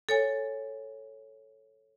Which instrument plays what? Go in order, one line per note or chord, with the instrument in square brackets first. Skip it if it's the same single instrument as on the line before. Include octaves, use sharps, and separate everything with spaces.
[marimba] A4 C#5 G#5